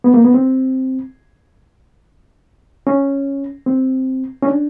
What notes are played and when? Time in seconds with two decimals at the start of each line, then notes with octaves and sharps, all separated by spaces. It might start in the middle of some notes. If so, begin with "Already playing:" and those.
0.04 B3
0.14 A#3
0.25 B3
0.34 C4
2.87 C#4
3.66 C4
4.43 C#4
4.48 D4